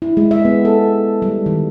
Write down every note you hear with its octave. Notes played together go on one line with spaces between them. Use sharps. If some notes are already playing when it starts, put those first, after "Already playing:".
E4
G#3
E5
B3
A4
G3
D#3